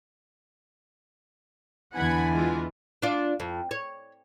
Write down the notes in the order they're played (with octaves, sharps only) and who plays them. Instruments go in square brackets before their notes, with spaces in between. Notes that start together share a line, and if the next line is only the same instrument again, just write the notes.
[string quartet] E2 [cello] D3 E4 [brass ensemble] B3 G#5 [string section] F#5 B5 G#6
[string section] E3 G#3 F4
[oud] D4 F4
F2
C#5